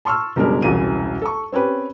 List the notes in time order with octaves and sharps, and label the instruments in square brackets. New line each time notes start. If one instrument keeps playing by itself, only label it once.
[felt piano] A5 C6 C#6 E6 F6
F#1 B2 G3 G#3 D4 A#4
E1 C2 C#3 E3 F#4 D#7
A4 C#6
C4 C#4 G4 B4